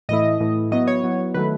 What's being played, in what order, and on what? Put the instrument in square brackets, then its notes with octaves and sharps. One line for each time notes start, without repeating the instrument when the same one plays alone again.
[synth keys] A2 E3 A3 E4 D#5
A2 E3 A3 E4
F#3 B3 E4 D#5
C#5
F#3 B3 E4
D#3 F#3 A3 B4